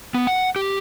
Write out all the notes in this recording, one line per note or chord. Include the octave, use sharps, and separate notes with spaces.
B3
F#5
G4